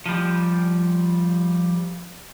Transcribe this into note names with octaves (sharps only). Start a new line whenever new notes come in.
F3 G3